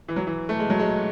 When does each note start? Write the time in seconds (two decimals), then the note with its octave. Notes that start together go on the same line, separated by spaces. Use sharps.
0.08 E3
0.16 F#3
0.27 E3
0.49 A3
0.59 G#3
0.70 F#3
0.79 G#3